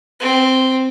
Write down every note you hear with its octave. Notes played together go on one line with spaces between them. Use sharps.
C4